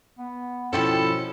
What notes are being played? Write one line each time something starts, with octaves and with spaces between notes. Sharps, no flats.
B3
B2 F3 C#4 E4 F#4 A4 G5 B5